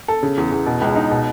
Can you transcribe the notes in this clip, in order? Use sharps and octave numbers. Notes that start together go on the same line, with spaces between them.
A4
C#3
E2
E2
B2
C#2
D#4
B2